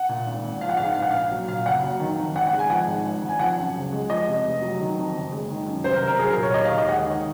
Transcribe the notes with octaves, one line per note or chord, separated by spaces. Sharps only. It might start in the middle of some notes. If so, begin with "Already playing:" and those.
Already playing: F#5
A#2
G#1
G#1
F3 F5
F#5
G#2 F5
F#5
A#1 F5
F#5
A#1 F5
F#3
A#2 F5
F#1 F#5
F#3
D#3
F2
G#1 F#5
F#5
G#3
G#5
F3 F#5
G#2
G#1
G#1
G#5
F3 F#5
F#2
C#2
G#3
F3 D#5
C3
F1
F#3
D#3
F2
F#1
G#3
D#3
F#2
C2 C5
A#4
C2
A#4
F#3 G#4
A#4
A#2
C#5
D#2 D#5
F5
D#2
D#5
G#3 F#5
D#3